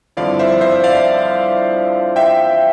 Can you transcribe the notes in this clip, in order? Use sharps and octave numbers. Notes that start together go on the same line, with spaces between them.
G2 D3 F3 C4 E4 D5 F5
C5 E5
C5 E5
D5 F5
E5 G5